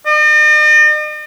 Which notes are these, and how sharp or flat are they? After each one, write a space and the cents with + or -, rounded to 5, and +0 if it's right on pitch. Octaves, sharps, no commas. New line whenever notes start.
D#5 -45